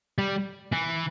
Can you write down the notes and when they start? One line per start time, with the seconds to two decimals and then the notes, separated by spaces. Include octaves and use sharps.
0.18 G3
0.72 E3